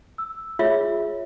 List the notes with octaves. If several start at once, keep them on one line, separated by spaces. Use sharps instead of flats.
E6
F4 G#4 C#5 E5